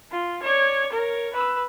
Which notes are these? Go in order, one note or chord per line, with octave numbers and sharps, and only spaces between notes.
F4
C#5 D5
A#4 C#5
B4 E6